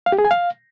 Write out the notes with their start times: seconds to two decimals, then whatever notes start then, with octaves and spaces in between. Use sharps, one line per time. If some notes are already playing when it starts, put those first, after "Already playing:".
0.06 F5
0.12 G4
0.19 G#4
0.25 G#5
0.31 F5